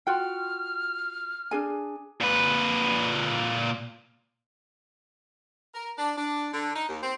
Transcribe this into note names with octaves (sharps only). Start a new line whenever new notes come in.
F4 F#4 G5 F6
D4 G#4 G#5
A#2 B4
A#4
D4
D4
D3
D#4
D#2
C4